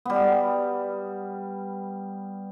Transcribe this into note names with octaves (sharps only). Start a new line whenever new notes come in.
G3 B3